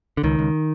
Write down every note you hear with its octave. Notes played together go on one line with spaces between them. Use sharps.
D3
C#2 D#3
C#2